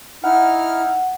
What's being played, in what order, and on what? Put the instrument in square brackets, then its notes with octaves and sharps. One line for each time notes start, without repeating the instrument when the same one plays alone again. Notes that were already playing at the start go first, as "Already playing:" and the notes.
[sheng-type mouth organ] D#4 E4 F6 [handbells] F#5